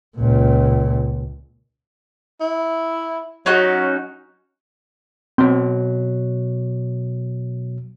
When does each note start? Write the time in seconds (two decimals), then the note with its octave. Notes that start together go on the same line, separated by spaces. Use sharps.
0.17 C#2 A#2
2.41 E4
3.46 F#3 C#4 D#4 F#4
5.38 B2 F#3 C4